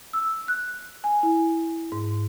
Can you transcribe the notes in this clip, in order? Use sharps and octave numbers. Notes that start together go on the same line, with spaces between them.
E6
F#6
G#5
E4
G#2